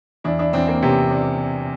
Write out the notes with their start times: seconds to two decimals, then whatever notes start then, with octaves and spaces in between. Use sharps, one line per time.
0.24 E2 D4 E4
0.39 D4 E4
0.53 E2 C4 D4
0.68 A#3 C4
0.82 C3 B3 C#4
1.11 C4 D4